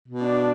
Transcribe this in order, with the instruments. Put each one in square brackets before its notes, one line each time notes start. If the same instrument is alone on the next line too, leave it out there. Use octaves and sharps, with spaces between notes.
[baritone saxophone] B2
[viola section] D4